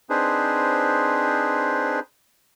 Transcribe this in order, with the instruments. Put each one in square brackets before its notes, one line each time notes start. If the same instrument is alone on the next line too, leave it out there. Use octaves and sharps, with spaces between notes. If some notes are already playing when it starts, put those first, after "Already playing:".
[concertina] C4 D4 D#4 G#4 B4 C5